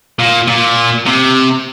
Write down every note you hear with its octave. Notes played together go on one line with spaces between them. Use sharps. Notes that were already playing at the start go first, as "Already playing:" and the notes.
A#2
A#2
C3